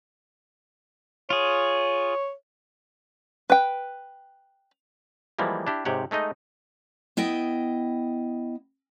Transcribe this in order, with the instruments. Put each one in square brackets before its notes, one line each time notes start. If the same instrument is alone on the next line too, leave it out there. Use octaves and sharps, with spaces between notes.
[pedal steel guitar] F4 G#4 [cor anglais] C#5
[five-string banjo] B4 G5
[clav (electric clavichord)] E3 F3 G3 G#3 A#3
D4 E4 G4
G#2 C3 G4 C#5 F#5
G#3 A3 D#4 D#5
[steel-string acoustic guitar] B3 E4 D#5 G5